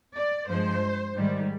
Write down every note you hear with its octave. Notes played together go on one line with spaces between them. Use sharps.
D5
G2 F3 G#3 C5
G#2 D#3 G3